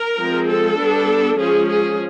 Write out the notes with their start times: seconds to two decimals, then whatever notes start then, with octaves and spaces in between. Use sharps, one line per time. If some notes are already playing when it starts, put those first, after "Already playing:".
Already playing: A#4
0.17 F3 G#3 C4
0.48 A4
0.77 G3 B3 D4
1.38 F3 G#3 C#4 G#4
1.68 G#4